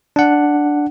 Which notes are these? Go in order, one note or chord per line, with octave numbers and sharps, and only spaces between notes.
D4 F#5